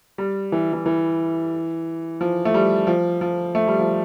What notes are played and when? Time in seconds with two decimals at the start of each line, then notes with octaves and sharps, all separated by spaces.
0.18 G3
0.52 E3
0.73 E3
0.86 E3
2.21 F3
2.45 A3
2.54 G3
2.87 F3
3.21 F3
3.55 A3
3.68 G3
3.79 F3